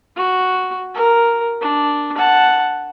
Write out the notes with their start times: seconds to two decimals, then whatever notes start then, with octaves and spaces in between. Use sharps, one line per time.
0.16 F#4
0.94 A#4
1.61 D4
2.18 F#5 A5